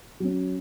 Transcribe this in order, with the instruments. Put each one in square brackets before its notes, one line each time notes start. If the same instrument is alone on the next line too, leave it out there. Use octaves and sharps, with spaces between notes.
[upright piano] F#3 C#4